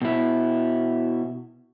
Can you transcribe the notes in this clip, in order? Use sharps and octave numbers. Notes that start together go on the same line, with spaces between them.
B2 E4